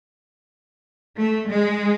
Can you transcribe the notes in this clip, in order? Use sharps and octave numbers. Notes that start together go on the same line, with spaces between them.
A3
G#3